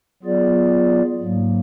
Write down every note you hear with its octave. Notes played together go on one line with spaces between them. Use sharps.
F#3 B3 F4 G#4 D5
G#2 F#3 A#3